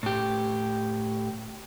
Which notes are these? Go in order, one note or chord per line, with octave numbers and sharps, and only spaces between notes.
A2 G4